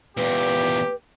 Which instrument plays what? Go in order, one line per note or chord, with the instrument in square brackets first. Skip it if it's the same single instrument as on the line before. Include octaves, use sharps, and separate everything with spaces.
[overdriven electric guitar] E2 A#2 [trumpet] G4 [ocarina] B4